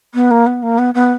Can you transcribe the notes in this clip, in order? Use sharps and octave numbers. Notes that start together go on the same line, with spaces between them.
B3
A#3
B3
A#3
B3
B3